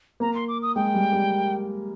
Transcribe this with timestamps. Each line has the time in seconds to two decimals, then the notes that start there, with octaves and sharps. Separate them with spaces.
0.20 A#3 A#5
0.35 C6
0.48 D6
0.62 D#6
0.76 G#3 G5
0.94 G3
1.13 G3